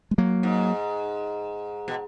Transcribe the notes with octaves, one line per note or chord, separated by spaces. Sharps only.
G#3
F#3 A#3
G#2
B2